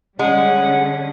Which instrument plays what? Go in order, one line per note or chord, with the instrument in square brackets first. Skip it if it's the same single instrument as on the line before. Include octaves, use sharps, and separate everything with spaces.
[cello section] D3 G3 C#4 [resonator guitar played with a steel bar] G#3 [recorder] F#5